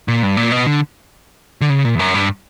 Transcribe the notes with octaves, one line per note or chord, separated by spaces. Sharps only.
A#2
G2
A#2
B2
D3
D3
C#3
A#2
E2
F#2
G2